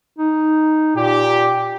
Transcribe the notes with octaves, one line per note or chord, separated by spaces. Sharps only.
D#4
A#2 G4